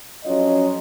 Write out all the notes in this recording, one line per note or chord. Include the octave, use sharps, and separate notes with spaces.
F2 F#3 C#4 F4 D#5